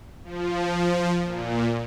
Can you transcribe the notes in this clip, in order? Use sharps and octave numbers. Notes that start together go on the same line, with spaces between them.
F3
A#2